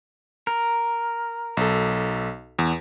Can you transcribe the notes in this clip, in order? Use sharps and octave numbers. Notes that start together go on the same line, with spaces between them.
A#4
B1 A4
E2